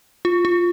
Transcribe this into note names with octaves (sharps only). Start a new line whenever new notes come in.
F4
F4